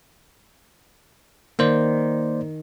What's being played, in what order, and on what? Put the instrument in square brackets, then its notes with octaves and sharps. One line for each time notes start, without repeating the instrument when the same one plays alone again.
[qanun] D#3 [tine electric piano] A#3 C5 D5